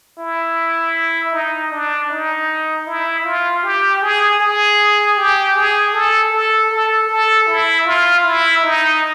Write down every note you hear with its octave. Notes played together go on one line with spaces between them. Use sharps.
E4
D#4
D4
D#4
E4
F4
G4
G#4
G#4
G4
G#4
A4
A4
A4
A4
E4
F4
E4
D#4